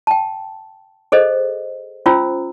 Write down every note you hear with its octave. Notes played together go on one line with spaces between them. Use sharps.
G5 A5
G#4 A4 C5 D#5
C#4 F4 C5 A#5 E6